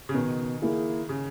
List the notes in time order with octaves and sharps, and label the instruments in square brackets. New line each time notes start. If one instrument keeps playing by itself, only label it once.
[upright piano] C#3
[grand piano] B2 [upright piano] D#3
[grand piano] A#3 E4 G#4
[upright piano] C#3